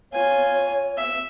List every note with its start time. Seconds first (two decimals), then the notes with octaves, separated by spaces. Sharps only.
0.13 F4 C#5 G#5
0.97 E5